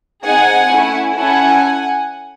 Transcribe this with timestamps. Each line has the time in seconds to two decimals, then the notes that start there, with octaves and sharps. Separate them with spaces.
0.24 C4 D#4 G#4 F#5 G#5
0.70 A3 C#4 E4
1.16 C#4 E4 A4 F#5 G#5